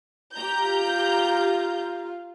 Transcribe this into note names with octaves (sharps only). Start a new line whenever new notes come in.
G4 A#5 G6
F4